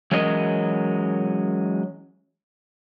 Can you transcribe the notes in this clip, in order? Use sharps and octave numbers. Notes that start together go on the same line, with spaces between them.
E3 F#3 G#3 C#4 A#4 D#5